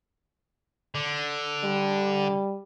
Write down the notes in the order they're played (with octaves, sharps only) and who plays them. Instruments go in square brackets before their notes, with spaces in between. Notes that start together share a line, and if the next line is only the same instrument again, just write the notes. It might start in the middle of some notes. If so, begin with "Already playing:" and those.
[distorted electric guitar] D3
[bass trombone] G3